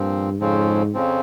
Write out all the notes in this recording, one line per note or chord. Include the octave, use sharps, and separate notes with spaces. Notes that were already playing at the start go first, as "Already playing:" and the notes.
Already playing: G2 A#2 F3 C4
F2 G#2 C#3 F3 C4
F2 C#3 F3 C4